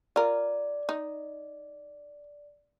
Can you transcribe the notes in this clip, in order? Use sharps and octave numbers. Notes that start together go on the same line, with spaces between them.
F4 A#4 D5
D#4